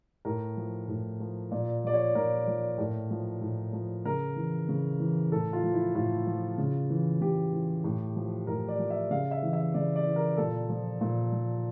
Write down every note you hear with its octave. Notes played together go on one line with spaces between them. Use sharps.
A2 A#4
F3
A2
F3
A#2 D5
F3 D5
C#5
A#2 A#4
F3
A2
F3
A2
F3
C#3 A#4
E3
C#3
E3
A2 A4
F4
F3
E4
A2 F4
F3
C#3
E3
C#3 G4
E3
A2
F3
A2 A#4
D5
F3
E5
C#3 F5
E5
E3
E5
C#3 D5
D5
E3
A#4
A#2 A4
F3
A#2
F3